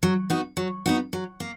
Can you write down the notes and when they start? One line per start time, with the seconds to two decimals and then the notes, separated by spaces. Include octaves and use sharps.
0.03 F#3
0.30 B3 D#4 F#4
0.57 F#3
0.86 B3 D#4 F#4
1.13 F#3
1.40 A#3